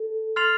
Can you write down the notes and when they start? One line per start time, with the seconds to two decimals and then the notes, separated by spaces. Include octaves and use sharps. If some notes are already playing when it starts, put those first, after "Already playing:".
Already playing: A4
0.36 C6 F6 A6 C7 F7